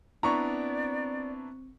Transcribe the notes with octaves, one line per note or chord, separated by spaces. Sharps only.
B3 C4 D4 E4 D5 A#5 C#6